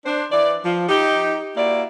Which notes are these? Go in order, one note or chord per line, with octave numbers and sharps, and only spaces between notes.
D4 C5
E3 D5
F3
D#4 G4
A#3 E4 F#4 D5